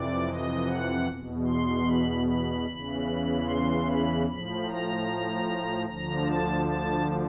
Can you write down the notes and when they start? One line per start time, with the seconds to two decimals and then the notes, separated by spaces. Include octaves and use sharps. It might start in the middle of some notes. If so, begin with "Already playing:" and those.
Already playing: F2 C3 E3 D5
0.27 D#5
0.67 F#5
1.07 E2 B2
1.47 C6
1.87 B5
2.27 B5
2.67 E2 C#3 E3
3.46 C6
3.87 B5
4.27 A2 F3 B5
4.67 A#5
5.86 D2 D3 F3 A#5
6.26 A5
6.66 A5